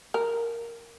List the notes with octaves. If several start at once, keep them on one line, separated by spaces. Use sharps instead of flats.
A#4